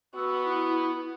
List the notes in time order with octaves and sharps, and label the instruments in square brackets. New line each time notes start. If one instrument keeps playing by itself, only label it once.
[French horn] B3 [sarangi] F#4 [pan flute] E6
[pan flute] E4